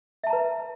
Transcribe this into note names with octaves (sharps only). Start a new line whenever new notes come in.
B4 E5 A5 A#5